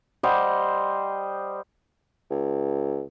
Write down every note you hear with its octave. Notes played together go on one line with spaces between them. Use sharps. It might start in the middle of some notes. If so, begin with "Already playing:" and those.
G3 C5 D#5 F#5
C#2